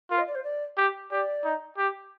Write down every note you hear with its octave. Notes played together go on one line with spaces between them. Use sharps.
F4 A#4
D#5
D5
C5
D5
G4
G4 D5
D#4
G4